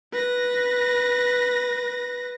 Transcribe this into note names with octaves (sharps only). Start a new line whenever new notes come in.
B4 A#6